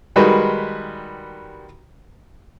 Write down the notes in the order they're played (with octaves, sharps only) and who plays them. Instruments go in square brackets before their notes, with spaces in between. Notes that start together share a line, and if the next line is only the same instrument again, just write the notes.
[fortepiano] D#3 G3 G#3 F#4 B4